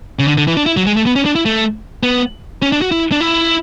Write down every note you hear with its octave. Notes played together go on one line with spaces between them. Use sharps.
C#3
D3
D3
E3
D4
E4
F#3
G#3
A3
B3
C#4
D4
E4
A3
B3
C#4
D4
F#4
E4
D4
E4